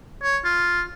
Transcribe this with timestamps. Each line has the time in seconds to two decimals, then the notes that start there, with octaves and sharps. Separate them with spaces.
0.23 C#5
0.45 F4